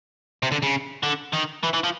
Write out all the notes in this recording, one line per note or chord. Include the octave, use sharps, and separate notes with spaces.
C3
D3
C#3
D3
D#3
E3
E3
F3